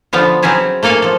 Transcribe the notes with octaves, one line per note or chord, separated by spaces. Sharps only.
D3 F3 A3 B3 F4
F#3 C4 C#4 E4 G#4
A3 A#3 A4 F5 G#5
F3 A4